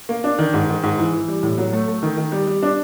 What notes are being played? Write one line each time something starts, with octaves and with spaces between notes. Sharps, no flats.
A#3
D4
D#3
G#2
D#3
G#2
E3
E3
G3
A2
F#3
A3
A3
D#3
D#3
G3
G3
D4